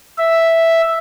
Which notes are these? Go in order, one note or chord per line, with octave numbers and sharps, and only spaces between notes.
E5